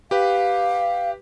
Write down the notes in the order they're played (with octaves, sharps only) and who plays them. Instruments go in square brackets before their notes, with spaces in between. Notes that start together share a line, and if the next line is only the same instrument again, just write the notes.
[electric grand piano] G4 B4 [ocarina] F5